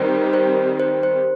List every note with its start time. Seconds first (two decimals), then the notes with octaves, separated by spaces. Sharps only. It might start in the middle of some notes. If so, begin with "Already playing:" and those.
Already playing: D#3 G3 C4 G4 C5
0.33 C5
0.80 C5
1.03 C5